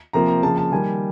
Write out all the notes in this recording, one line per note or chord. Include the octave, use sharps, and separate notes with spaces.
C3 F3 A#3 A#5
A#5
C#3 F3 A#3 A5
A5
D#3 G3 A#3 G#5